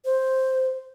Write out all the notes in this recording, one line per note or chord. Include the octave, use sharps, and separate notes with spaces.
C5